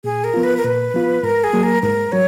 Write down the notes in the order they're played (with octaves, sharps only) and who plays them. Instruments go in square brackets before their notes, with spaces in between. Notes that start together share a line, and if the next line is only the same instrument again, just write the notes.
[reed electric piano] A#2 [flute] G#4
[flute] A#4
[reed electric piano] F3 B3 F4
[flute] B4
A#4
[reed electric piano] A#2 [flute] B4
[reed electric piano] F3 B3 F4
[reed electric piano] G#2 [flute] A#4
[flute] G#4
[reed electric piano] F#3 A#3
[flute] A#4
[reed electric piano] G#2 [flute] A#4
[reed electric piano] F#3 [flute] C#5